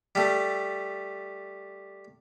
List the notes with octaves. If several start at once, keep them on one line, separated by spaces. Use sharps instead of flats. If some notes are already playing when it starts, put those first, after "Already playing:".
G3 A3